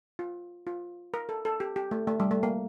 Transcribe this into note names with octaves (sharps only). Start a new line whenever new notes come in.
F4
F4
A#4
A4
A4
G4
G4
A3
A3
G3
A3
A#3